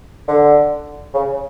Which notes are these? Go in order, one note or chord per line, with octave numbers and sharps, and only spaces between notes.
D3
C#3